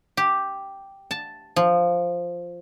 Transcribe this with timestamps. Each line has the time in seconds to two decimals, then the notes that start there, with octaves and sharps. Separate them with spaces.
0.17 G4
1.11 A5
1.56 F3